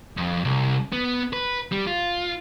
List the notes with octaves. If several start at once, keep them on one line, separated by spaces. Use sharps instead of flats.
F2
C2
B3
B4
G3
F4